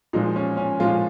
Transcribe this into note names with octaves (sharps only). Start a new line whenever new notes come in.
A#2 F3 G#3 D#4
C#4
C#4
A#2 F3 G#3 F4